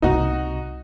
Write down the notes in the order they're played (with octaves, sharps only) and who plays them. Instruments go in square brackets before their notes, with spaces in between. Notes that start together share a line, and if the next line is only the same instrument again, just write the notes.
[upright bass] C2 C3 [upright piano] D#4 F#4